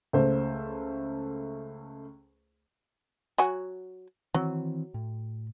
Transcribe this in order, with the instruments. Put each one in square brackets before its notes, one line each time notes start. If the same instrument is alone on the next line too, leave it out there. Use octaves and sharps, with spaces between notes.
[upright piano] C#2 A3 C5
[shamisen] F#3 F#4 G#5
[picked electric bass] D#3 E3 C4 [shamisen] F#3
[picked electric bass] A2